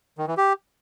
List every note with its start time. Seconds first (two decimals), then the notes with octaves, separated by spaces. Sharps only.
0.18 D#3
0.28 E3
0.37 G4